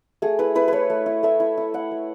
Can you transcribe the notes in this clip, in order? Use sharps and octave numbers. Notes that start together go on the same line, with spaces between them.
A3 G#4
E4 B4
E4 B4
A3 B4 C#5
A3
E4
A3 E5
E4
E4
A3 F#5
A3